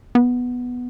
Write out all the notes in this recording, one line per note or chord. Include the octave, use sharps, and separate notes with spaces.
B3